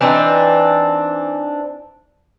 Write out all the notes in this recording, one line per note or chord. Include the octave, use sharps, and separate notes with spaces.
E3 C4 D4 D#4